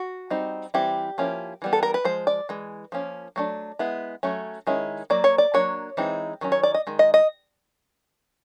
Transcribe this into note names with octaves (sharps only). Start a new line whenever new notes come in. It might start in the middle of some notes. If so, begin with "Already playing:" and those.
Already playing: F#4
G3 C4 D#4
E3 G3 C4 E4 G4
F3 A#3 C#4 E4
E3 G3 B3
A4
A#4
B4
F3 G#3 C5
D5
E3 G#3
F3 A#3 C#4
F#3 A3 D4
G#3 B3 E4
F#3 A3 C#4
D#3 G#3 C#4 E4
F#3 A#3 D5
C#5
D5
F#3 A#3 D4 C#5
E3 G#3 C4 D#4
D#3 F#3 C#4
C#5
D5
D#5
D#3 G#3
D#5
D#5